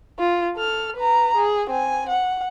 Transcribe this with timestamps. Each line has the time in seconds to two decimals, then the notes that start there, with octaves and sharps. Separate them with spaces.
0.20 F4
0.56 A4 F6
0.96 B4 A#5
1.36 G#4
1.71 C4 G#5
2.09 F#5